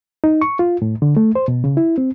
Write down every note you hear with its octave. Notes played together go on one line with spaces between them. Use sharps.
D#4
C#6
F4
A2
D3
A3
C5
B2
C#3
E4
C4